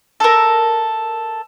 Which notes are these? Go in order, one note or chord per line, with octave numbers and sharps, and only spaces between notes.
A4 A#4